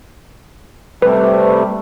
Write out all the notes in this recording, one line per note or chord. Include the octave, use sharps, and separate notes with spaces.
C3 G3 A3 B4